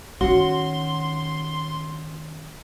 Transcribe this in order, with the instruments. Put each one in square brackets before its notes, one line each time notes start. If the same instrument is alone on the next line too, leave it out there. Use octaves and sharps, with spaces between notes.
[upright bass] D#3 [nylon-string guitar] C#4 F#4 [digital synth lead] C6